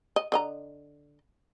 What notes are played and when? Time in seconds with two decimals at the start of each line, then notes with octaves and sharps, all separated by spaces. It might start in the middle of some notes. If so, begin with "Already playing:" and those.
0.16 D#5
0.32 D3 D#5 A#5